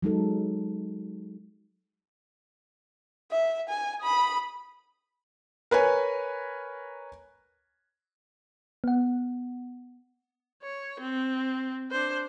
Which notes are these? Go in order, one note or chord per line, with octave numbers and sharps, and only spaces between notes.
F#3 G#3 D#4 A4
E5
G#5
B5 D#6
A#4 B4 C#5 G#5
B3 F#5
C#5
C4
D4 C5